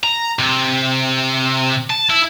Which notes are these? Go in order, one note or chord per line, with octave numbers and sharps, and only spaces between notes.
A#5
C3
A5
E4